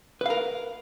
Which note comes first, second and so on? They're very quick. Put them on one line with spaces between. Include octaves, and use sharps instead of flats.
B4 F5 A#4